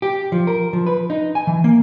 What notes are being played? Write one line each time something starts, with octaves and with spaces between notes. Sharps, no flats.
G4
F3
A#4
F3
B4
D#4
G#5
E3
A#3